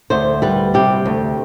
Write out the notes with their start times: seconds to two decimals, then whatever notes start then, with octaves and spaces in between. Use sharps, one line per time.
0.10 D2 C5
0.42 G3 B4
0.74 C3 G4
1.06 D2